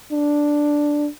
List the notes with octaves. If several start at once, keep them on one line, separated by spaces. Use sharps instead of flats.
D4